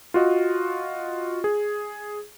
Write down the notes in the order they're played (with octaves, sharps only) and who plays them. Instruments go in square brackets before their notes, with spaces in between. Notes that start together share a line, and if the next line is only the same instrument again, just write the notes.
[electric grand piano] F4 F#4 D#5
G#4